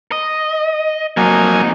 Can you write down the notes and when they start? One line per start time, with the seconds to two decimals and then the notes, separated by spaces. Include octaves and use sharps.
0.12 D#5
1.17 F2 F#3 A#3 D#4 G#5